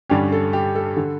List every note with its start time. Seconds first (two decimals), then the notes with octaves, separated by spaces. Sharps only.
0.10 G2 D3 G3 C#4 G4
0.32 A4
0.53 G4
0.75 A4
0.97 D3